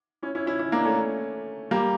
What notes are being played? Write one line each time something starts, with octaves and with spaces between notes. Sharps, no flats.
C#4 E4
C#4 E4
C#4 E4
C#4 E4
A#3 D4
A3 C#4
G3 A#3